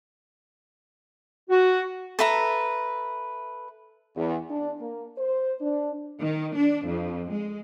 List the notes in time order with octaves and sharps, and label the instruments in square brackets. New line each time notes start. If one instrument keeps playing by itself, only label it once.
[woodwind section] F#4
[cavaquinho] A4 B4 E5 A#5
[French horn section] E2
D4
A#3
C5
D4
[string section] D#3
D4
F2
G#3